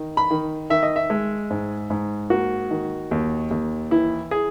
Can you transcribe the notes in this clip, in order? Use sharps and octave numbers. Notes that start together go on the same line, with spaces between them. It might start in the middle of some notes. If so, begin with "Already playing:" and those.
Already playing: D#3
B5
D#3
D#3 E5
D#5
E5
G#3
G#2
G#2
A#3 F#4
D#3
D#2
D#2
E3 E4
G#4